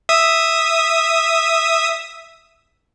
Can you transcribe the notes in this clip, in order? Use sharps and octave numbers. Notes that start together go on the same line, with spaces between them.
E5 D#6